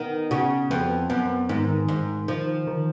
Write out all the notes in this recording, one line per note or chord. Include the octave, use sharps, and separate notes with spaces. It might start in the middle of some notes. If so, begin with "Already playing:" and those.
Already playing: D#3 B3
C#3 F#4
F2 B3
F#2 B3
G#2 D#3
G#2 D#3
D#3 F3
D#3